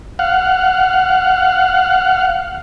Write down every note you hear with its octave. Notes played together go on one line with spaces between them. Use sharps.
F5 F#5